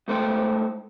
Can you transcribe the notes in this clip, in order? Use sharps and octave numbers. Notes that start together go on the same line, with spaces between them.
G#2 A3 C5 G5